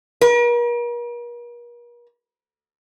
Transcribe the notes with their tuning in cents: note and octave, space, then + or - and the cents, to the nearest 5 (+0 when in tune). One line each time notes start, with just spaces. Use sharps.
A#4 +45